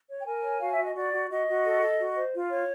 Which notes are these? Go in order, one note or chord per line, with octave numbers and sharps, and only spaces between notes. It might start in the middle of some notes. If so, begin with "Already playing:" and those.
C#5
G5
A#4 G#5
C#5
F#4 F5
E5
F#4
D#5
F#4 D5
F#4
F#4 D#5
F#4
A4
A4
F#4
C5
F4
C#5